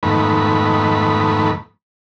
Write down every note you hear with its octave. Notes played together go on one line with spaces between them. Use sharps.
F2 G#2 D#3 A3 B3 B5